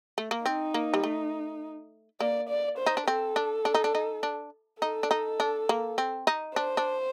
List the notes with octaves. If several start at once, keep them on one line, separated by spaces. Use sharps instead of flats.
A3
A#3
C4 D#4
A#3
G3
A3
A#3 D5
D5
C5
D#4
D4
C4 A4
D4
D4
D#4
D4
D#4
D4
D#4 A4
D4
D#4
D4
A#3
C4
D#4
D4 C5
D4